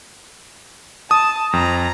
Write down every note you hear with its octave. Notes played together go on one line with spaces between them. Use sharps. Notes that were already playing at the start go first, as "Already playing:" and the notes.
A5 D#6
F2 A#5